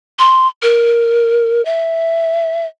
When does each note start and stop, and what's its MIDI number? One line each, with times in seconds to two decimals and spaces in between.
0.19 0.47 84
0.62 1.64 70
1.65 2.66 76